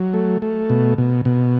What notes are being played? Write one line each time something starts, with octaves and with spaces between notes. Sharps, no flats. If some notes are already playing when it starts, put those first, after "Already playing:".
Already playing: F#3
A3
A3
B2
B2
B2